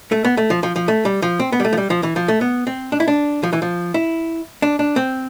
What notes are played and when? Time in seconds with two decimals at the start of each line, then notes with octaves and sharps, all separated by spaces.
0.12 A3
0.25 B3
0.37 A3
0.50 F3
0.63 F3
0.76 F3
0.88 A3
1.05 G3
1.22 F3
1.40 C4
1.52 B3
1.60 G3
1.65 A3
1.73 F3
1.77 G3
1.90 F3
2.03 E3
2.16 F3
2.28 A3
2.41 B3
2.67 C4
2.92 D4
3.00 E4
3.08 D4
3.43 F3
3.53 E3
3.62 F3
3.94 E4
4.62 D4
4.79 D4
4.96 C4